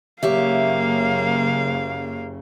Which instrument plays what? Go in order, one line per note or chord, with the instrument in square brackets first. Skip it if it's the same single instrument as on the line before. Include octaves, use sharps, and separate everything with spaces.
[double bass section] F#1 C#3 [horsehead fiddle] A#3 F5 [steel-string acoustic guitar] G4 C#5 E5